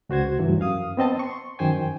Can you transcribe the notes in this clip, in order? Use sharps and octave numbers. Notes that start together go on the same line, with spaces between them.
C#2 F#4 C5 G#6
D2 G2 E3 F#3
F#2 F5 D#6
B3 C4 D#5 A5
C6 C#6
F#2 D#3 C5 G5 G#5